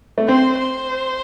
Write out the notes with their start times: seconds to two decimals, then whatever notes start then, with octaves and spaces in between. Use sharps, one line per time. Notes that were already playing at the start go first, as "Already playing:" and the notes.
0.18 A3
0.28 C4 C5
0.58 C5